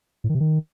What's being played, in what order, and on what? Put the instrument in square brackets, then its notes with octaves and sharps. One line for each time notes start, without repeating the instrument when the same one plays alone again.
[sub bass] A2
D#3
C3
D#3